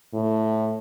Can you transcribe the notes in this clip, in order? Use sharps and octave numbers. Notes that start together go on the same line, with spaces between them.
A2